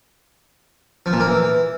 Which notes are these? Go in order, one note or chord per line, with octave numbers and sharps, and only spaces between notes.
F3
A#2
A#3
E3